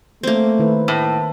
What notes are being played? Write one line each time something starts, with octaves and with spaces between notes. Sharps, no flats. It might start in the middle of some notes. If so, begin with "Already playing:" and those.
A3 A#3 C4
D#3 E4 B4
A2